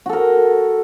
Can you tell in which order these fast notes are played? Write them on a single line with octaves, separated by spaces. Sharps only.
F#4 A4 A#4